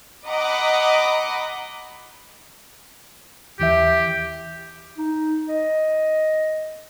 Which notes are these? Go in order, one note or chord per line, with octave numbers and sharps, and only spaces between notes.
D#5 F#5 A#5 B5 D6
D#2 E3 G4 E5
D#4
D#5